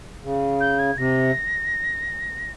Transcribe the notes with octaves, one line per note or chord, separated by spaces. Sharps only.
C#3
G6
G#6
C3 A#6